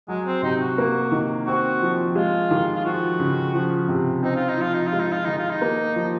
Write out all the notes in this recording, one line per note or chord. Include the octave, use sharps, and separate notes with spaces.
F#3 G#3
C4
C3 D#4
F#4
A#3
D#3
C4 F#4
F3
G#3 F4
D#3
F4
F3 F#4
C#3
F3
C3
C4 D#4
F4
D#4
F3 F4
D#4
F4
G#3
D#4
F4
D#3 D#4
F4
D#4
A#3
F3